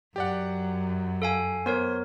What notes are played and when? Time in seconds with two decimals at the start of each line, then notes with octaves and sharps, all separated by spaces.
0.16 F#2 G4 D5 F#5
1.22 A4 F5 G#5
1.66 B3 A#4 C5 C#5